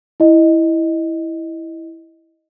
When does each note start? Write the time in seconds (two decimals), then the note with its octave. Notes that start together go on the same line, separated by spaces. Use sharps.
0.20 E4 D#5